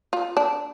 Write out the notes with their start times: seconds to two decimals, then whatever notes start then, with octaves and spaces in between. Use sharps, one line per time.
0.13 F4
0.37 D4